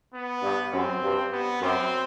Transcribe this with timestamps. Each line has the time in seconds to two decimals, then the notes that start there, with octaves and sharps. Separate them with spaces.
0.14 B3
0.43 G2
0.73 F#2 C4
1.02 G2
1.32 B3
1.62 F#2 C4